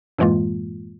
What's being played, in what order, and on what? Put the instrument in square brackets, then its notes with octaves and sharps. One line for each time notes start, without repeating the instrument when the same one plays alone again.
[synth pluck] F#2 A2 E3 G#3 A#3 F4